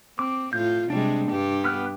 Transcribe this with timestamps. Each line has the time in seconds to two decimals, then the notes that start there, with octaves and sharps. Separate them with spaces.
0.19 C4 D6
0.53 A2 F4 G6
0.90 C3 G3 G#3 D4
1.29 G2 G4
1.64 B3 F6 F#6